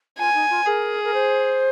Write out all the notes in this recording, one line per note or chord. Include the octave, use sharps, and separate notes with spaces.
F4 G#5
D#4
F4
G#4 A#4
A#4
C5